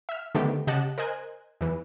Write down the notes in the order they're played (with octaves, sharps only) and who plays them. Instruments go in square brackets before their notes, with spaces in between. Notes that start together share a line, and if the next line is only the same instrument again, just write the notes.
[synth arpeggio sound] E5 F6
D3 D#3 A3 B3 C4 G4
C#3 G4 D#5 F#5 A5 F#6
A#4 C5 D#5 G#5 F#6 G#6
E2 E3